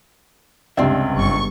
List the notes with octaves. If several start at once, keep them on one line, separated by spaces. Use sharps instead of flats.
C#2 G2 C3 C4 D5 E5
G1 C#6